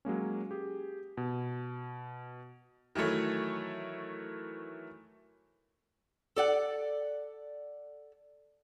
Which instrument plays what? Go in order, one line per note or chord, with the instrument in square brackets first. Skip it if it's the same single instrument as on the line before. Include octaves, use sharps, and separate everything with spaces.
[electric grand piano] F#3 G#3 A#3 C#4
G4 G#4
B2
[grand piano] D#3 E3 F#3 A3 C#5
[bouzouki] A4 D5 F#5